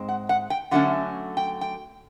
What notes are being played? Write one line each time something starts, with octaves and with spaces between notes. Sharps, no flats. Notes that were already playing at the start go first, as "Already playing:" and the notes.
Already playing: G#2 G#3 C4
F#5
F#5
G5
D3 F#3 A3 C#4 F#5
G5
G5